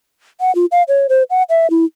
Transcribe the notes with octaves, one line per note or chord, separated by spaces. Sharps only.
F#5
F4
F5
C#5
C5
F#5
E5
E4